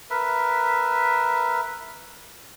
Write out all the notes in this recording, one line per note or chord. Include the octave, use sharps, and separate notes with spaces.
A#4 B4 E5